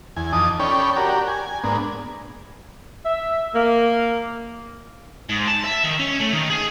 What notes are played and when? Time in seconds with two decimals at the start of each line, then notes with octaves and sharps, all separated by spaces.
0.16 E2 G#5
0.33 F2 D#4 A5 D6 D#6
0.60 C#4 A4 C#5 D5 G5 B5
0.96 F#4 G4 A#4 D5
1.28 G#5
1.64 G#2 A#3 B3 D4
3.05 E5
3.55 A#3
5.29 G#2
5.48 A5
5.65 E5
5.84 D#3
6.00 C#4
6.20 A3
6.33 D#3
6.50 G#4